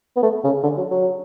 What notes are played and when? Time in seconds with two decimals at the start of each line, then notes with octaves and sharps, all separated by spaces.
0.17 B3
0.23 A3
0.44 C#3
0.64 D3
0.77 F#3
0.91 F#3